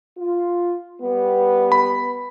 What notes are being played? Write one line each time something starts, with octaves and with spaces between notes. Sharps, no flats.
F4
G3 B3
B5